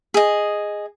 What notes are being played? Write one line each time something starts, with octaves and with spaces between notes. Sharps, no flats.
G#4 D#5